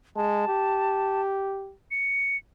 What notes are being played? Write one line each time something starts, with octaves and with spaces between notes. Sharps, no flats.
G#3 A5
G4
C#7